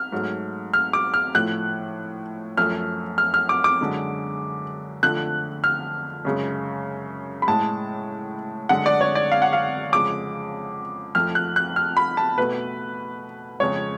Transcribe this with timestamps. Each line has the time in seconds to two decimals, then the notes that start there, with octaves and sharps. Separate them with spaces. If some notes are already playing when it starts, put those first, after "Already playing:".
Already playing: F6
0.12 G#2 F#3 A3
0.74 F6
0.93 D6
1.14 F6
1.34 A2 F3 A3 F#6
2.57 F#2 F3 A3 F6
3.18 F6
3.34 F6
3.49 D6
3.64 D6
3.80 F#2 D3 G#3
5.03 F2 D3 F3 A3 F#6
5.64 F6
6.25 F#2 C#3 G#3
7.42 B5
7.47 A2 G#3 A5
8.69 F#2 D3 G#3 F#5
8.86 D5
9.01 C#5
9.15 D5
9.32 F5
9.42 F#5
9.53 F5
9.92 F2 C#3 G#3 D6
11.15 F2 F3 A3 F6
11.35 F#6
11.56 F#6
11.76 F6
11.97 B5
12.17 A5
12.38 B2 A3 B4
13.60 F2 C#3 G#3 C#5